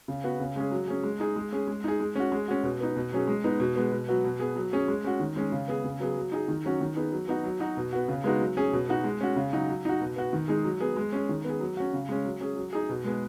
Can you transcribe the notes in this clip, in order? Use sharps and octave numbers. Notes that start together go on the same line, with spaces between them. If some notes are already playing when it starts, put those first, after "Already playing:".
C#3
B3 F#4
C#3
G#3 C#4 G#4
F#3
C#4 G#4
G#3
D#4 G#4
G#3
C#4 G#4
G#3
D#4 G#4
G#3
C#4 F#4
G#3
C#4 F#4
B2
B3 D#4
B2
F#3 C#4 G#4
G#3
B3 D#4
B2
G#3 B3
B2
F#3 B3 F#4
B2
B3 G#4
F#3
C#4 G#4
G#3
C#4 F#4
D#3
G#3 C#4 G#4
C#3
B3 G#4
C#3
F#3 B3 G#4
F#3
D#4 G#4
D#3
F#3 C#4 F#4
D#3
B3 D#4 G#4
F#3
B3 D#4 F#4
F#3
D#4 F#4
B2
B3 F#4
C#3
G#3 B3 D#4 F#4
F#3
C#4 G#4
B2
B3 D#4 F#4
G#3
C#4 F#4
C#3
F#3 D#4 F#4
F#3
D#4 F#4
B2
B3 F#4
D#3
G#3 D#4 G#4
F#3
B3 G#4
G#3
C#4 G#4
D#3
B3 G#4
F#3
C#4 F#4
C#3
G#3 C#4
F#3
C#4 G#4
F#3
D#4 G#4
B2
G#3 B3 G#4